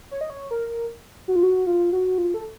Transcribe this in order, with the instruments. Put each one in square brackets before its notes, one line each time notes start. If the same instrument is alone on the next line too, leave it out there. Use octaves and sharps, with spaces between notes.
[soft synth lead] C#5
D#5
C#5
A#4
F#4
F4
F#4
F4
F#4
F4
A4